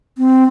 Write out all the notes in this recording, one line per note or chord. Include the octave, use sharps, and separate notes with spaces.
C4